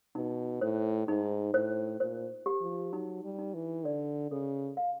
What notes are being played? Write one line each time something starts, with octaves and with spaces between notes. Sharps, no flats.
B2 D#4
A2 C5
G#2 D#4
A2 C5
A#2 C5
G4
F3
F#3 D#4
G3
D#4
E3
D3 D5
C#3 A4
F5